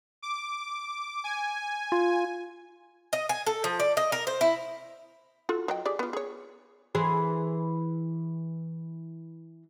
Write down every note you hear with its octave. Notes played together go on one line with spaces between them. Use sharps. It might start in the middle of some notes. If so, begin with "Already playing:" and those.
D6
G#5
F4
D#5
G#5
A4
F3
D5
D#5
A#4
C5
E4
F4 F#4 A4
F#3 D#5 G5
G4 G#4 D5
B3 F4
G#4 C#5
E3 G#4 C5